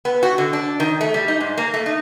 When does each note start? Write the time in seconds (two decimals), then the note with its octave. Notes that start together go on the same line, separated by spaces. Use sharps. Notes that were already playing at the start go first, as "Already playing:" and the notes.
0.05 B3
0.23 F#4
0.38 D3
0.53 D4
0.80 D#3
1.01 A3
1.14 G3
1.28 D#4
1.40 G#2
1.58 A#3
1.74 A3
1.86 D#4